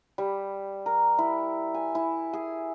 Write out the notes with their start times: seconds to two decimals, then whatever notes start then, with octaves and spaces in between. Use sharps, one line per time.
0.18 G3
0.86 A#4
1.18 E4
1.74 G#5
1.95 E4
2.33 G#4